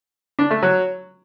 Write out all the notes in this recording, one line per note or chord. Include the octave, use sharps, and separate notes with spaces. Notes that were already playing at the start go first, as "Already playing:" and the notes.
D4
A3
F#3